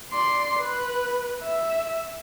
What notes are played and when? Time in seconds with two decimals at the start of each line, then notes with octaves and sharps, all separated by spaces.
0.13 D5 C6
0.60 B4
1.43 E5